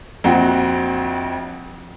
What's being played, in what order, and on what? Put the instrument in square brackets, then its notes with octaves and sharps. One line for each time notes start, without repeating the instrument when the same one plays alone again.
[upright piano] A#1 F2 C4 F#4 F#5 G5